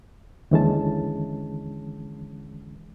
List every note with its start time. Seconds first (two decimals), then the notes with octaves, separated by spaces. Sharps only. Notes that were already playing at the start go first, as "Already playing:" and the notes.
0.51 D#2 D3 E3 G#3 C#4 A5